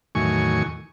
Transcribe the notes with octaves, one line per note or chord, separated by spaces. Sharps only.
E2 A2 D#3 F#3 G#5 C#6